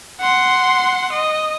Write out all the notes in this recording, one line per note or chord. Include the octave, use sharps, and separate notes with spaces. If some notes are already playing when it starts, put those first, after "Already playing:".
F#5 C6
D#5